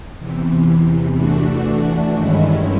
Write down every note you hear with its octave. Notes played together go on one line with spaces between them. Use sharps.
E2 C3 E3
E3 A3 D4 F#4
G2 D#3 G#3 C#4 E4